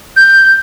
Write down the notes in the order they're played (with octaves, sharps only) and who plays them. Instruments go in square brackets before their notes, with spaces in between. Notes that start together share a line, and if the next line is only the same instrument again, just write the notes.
[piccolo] G6